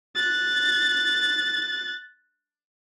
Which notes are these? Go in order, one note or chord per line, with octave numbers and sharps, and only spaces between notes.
F#6 A6